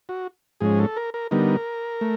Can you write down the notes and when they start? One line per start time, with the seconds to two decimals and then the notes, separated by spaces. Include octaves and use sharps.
0.09 F#4
0.61 G#2 F3 G#3 C#4 G#4
0.79 A4
0.97 A#4
1.14 A#4
1.31 D3 G3 B3 D#4 A#4
2.01 A3